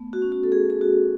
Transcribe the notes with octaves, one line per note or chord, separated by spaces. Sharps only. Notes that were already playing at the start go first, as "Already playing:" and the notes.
Already playing: A3 B3
F#4
C#4
F#4
A4
A3 G#4
G#4
F#4